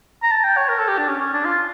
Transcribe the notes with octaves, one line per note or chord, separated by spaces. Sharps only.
A#5
A5
G5
C#5
A#4
A4
G4
D4
C#4
C#4
D4
F4